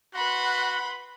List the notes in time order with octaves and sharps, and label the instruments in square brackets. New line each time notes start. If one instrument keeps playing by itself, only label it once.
[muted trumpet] F#4 [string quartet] B4 B5 C6 [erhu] F#5